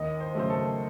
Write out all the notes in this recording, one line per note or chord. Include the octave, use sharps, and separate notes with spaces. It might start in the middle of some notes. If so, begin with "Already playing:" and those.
Already playing: D#2 D#5
C5
C#3 F#3 A3 C5
A4